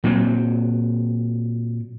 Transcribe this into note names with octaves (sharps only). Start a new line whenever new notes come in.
A#2 F#3 C4